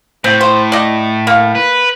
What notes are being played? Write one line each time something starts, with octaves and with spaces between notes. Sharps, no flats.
A2 C4
C5
D5 D#5
A#3
B4